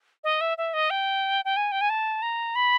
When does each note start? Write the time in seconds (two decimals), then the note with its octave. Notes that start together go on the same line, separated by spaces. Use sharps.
0.24 D#5
0.41 E5
0.58 E5
0.73 D#5
0.90 G5
1.45 G5
1.57 G#5
1.72 G5
1.81 G#5
1.90 A5
2.22 A#5
2.55 B5